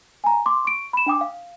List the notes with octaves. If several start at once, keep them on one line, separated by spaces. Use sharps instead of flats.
G#5 A#5
C6 D6
C#6 D7
B5 E7
D4 G5 D6 D#6
F5